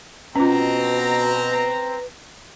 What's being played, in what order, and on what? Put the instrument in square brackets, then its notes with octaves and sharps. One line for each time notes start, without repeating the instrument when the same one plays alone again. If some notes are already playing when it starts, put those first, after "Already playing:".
[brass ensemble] B2 [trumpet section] C4 A#5 [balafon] C#4 F4 [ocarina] B4